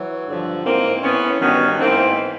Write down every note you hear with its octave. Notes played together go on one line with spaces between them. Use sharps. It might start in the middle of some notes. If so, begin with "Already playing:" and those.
Already playing: E3 F#3
G2 D3 F3
G#2 E3 A#3 C4
A2 E3 B3 C#4
G2 D#3 F#3 B3 C#4
G#2 E3 A#3 C4